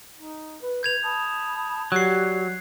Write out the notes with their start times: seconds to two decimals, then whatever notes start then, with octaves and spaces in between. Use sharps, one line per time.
0.17 D#4
0.62 B4
0.83 B4 G6 G#6 F7
1.03 A5 B5 D#6
1.92 F#3 G4 D5 F#6 C7